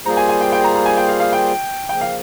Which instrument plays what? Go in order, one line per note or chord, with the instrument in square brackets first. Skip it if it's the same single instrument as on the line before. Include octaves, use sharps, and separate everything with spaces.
[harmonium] G3 A#3 F4 G#4 C5 [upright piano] A#5
[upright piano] G#5
G#5
G5
G5
A#5
A#5
G#5
G5
F5
F5
G5
[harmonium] C#3 F3 A#3 [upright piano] G5
[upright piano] F5